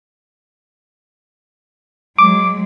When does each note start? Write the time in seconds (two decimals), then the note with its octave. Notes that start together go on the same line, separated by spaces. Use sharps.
2.18 F#3 G#3 D6